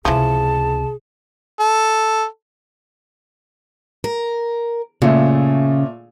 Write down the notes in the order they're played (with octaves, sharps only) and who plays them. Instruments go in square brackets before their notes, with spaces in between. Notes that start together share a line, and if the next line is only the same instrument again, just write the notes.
[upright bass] C#2 C3 [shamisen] E3 F3 [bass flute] G#4 [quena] A5
[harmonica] A4
[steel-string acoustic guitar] A#4
[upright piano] A#2 A3 [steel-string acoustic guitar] C#3